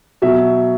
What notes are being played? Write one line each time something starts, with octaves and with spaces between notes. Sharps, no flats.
B2 F#3 E5